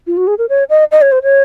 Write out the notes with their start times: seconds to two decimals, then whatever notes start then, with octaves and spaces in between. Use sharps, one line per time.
0.07 F4
0.17 F#4
0.27 G#4
0.38 A#4
0.49 C#5
0.70 D#5
0.91 D#5
1.02 C#5
1.12 C5
1.23 C#5